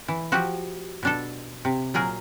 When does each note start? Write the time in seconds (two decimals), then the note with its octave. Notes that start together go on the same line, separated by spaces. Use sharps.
0.08 E3
0.32 F3 F#4 G4
1.03 B2 D4 A4
1.65 C3
1.94 A#2 F#3 G#4 A#4